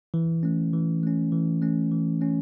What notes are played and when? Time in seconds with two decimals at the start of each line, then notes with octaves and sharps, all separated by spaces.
0.14 E3
0.43 A3 C#4
0.74 E3
1.03 A3 C#4
1.32 E3
1.62 A3 C#4
1.91 E3
2.21 A3 C#4